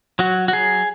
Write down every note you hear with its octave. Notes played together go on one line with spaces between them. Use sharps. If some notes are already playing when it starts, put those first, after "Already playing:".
F#3 F#4
F#4
F#3 G#4